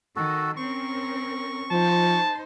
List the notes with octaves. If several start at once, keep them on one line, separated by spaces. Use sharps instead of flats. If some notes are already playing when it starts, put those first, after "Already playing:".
D#3 F#4 A4
C4 C#4 A#4 C#6
F3 D#4 C5 A5